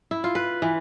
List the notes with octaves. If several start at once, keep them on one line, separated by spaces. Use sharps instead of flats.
E4
F4
B4
E3